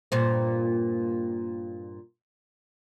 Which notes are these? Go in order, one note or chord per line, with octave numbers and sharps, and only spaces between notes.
G2 A#2 C5